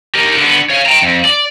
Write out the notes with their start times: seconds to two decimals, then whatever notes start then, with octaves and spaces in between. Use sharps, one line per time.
0.15 G4 A#4
0.37 D3 B3
0.70 C#5 F5
0.86 G5 A#5
1.02 F2
1.25 D5